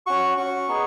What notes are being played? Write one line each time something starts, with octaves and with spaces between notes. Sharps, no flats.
C#4 F#4 C#6
C#4 F#4 C#6
B3 D#4 G#4